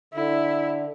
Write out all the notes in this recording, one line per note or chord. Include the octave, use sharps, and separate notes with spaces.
D3 E4